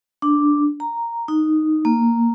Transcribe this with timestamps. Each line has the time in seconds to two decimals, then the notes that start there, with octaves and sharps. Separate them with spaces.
0.22 D4
0.80 A#5
1.28 D#4
1.85 A#3